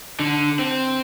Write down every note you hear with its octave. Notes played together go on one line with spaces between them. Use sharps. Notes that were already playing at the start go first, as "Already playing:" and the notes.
D3
C4